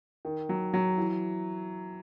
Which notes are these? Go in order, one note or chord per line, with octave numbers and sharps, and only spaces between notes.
D#3
F#3
F#3
E3